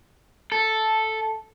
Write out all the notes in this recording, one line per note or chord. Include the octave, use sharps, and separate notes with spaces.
A4